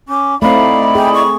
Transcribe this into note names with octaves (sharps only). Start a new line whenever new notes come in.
C#4 D6
A3 C4 D#4 E4 D5 F5 B5
G#4 G5
C#6